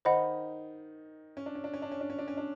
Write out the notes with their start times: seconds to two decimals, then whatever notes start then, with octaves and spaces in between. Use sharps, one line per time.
0.05 D#3 D#4 C5 D#5 F#5 B5
1.37 C#4
1.46 D4
1.55 C#4
1.64 D4
1.74 C#4
1.82 D4
1.91 C#4
2.01 D4
2.10 C#4
2.19 D4
2.28 C#4
2.37 D4